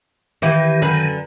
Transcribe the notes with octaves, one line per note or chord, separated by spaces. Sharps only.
D#3 E3 E4 G4
F#2 D3 B4